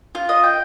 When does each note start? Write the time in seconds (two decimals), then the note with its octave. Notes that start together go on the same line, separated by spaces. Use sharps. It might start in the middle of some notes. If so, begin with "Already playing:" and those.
0.15 F4
0.29 D#5
0.43 G5